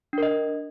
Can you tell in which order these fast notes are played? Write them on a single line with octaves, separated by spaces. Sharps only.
D4 A#4 D#5